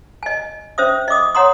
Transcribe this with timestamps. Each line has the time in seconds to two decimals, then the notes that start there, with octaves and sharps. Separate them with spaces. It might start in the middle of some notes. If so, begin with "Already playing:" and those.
0.23 D#5 G#5
0.78 C#4 C5 E5 D#6
1.08 D#5 E5 D6 D#6
1.35 C#5 F#5 A#5 C6 D#6